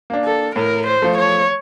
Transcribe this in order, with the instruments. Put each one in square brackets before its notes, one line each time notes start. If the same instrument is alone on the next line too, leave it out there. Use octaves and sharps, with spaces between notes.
[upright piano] A#3 D4
[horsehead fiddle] A4
[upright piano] A2 [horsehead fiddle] A#4
[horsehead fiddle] C5
[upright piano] F3 A3
[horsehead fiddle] C#5